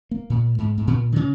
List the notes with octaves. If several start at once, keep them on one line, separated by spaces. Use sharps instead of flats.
A#3
A#2
G#2
G#2
A#2
D#3
C#3